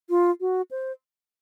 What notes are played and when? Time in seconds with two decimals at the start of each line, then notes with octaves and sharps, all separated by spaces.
0.10 F4
0.41 F#4
0.71 C5